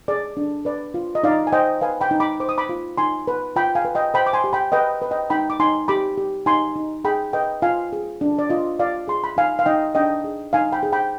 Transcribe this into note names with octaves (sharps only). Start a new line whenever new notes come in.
G#4 D5
D4
B4 D5
F4
D#5
D#4 D5 F5
G#5
C5 D#5 G5
B4 F5 G#5
G5 B5
D#4
B5 D6
C5 D6
D#6
B5 D6
F4
D#4 G#5 C6
B4
F4 G5 B5
F5 G#5
B4
D#5 G5
C5 G5 B5
D6
G#5 C6
G4
G5 B5
B4 D#5 G5
B4
D#5 G5
D#4 G5 B5
D6
D#4 G#5 C6
G4 B5 D6
G4
D#4 G#5 C6
D#4
G#4 G5 B5
B4 D#5 G5
F4 F5 G#5
G#4
D4
D5
F4 D#5
F4 D5 F5
G#4 C6
B5
D#4 F5 G#5
F5
D#4 D#5 G5
D4 D#5 G5
G#4
D#4 F5 G#5
G5 B5
G#4
G5 B5